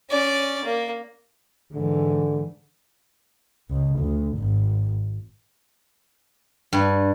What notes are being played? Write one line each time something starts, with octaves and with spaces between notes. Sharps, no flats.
C#4 D5
A#3
G#2 D3 E3
C#2
D2
G#1
G2